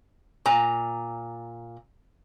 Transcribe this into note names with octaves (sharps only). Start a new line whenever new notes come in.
A#2 A#5